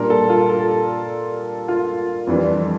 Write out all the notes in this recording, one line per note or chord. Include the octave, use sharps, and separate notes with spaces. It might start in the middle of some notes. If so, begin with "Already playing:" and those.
Already playing: A#2 G3 D4 A#4
A4
F4
A4
F4
F2 E3 G3 D4